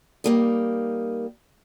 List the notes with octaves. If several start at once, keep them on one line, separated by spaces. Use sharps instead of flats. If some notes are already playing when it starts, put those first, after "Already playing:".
G3 A#3 D#4